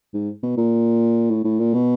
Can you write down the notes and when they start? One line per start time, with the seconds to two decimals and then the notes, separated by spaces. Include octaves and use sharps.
0.14 G#2
0.43 B2
0.57 A#2
1.30 A2
1.44 A2
1.60 A#2
1.74 B2